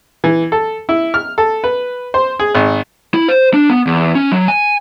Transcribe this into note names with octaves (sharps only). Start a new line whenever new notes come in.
E3
A4
E4
F6
A4
B4
C5
G#4
G#1
E4
C5
D4
B3
E2
C#4
F#3
G#5